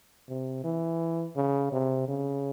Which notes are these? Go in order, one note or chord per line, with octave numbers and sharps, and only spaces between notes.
C3
E3
C#3
C3
C#3